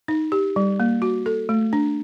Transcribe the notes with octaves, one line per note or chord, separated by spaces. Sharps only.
D#4
G4
G3
A#3
F#4
A4
A3
D4